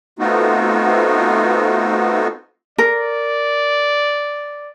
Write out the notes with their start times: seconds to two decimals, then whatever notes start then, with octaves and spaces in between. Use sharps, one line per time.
0.19 A3 B3 C4 D#4 F4 F#4
2.78 A#4 D5